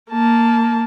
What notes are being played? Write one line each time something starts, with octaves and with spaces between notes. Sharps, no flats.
A#3 A5